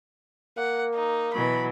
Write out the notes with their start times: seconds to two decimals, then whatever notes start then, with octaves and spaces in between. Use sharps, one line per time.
0.57 A#3 F#5
0.95 D#4
1.33 B2 E3 F#3 B5